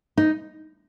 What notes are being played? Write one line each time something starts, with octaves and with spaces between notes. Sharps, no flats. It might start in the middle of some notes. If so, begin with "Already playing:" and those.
D#4